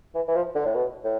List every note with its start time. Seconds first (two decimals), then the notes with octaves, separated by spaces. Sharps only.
0.15 E3
0.28 E3
0.35 F3
0.55 D3
0.65 A2
0.75 B2
1.04 A2